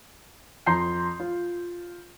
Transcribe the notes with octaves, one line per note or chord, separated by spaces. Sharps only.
F2 A#5 C6 G6 C7
F4